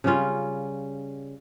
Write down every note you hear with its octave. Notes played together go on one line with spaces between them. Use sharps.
C#3 G3 C#4 F4